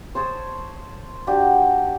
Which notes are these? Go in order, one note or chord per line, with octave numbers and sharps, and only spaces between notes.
C5 C#5 A5 D#6
D4 F#4 G4